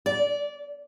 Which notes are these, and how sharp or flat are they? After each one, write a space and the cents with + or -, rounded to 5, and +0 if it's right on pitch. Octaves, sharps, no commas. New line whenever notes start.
D5 -20